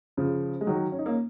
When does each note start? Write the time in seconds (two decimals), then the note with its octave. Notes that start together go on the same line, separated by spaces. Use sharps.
0.17 C#3 F3
0.61 G#3
0.67 D#3 F#3
0.92 C#4
0.99 D#4
1.06 A#3 C#4